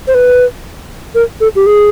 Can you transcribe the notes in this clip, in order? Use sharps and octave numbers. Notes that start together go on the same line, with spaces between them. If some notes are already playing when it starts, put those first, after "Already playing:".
C5
B4
A#4
A4
G4
G#4